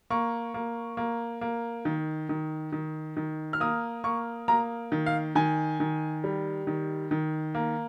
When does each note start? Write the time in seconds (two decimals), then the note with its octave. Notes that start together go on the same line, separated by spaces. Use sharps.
0.10 A#3 C#6
0.54 A#3
0.97 A#3
1.41 A#3
1.85 D#3
2.29 D#3
2.72 D#3
3.17 D#3
3.53 F6
3.60 A#3 D#6
4.04 A#3 C#6
4.48 A#3 A#5
4.92 D#3
5.06 F5
5.35 D#3 G#5
5.80 D#3
6.24 G3
6.67 D#3
7.11 D#3
7.55 A#3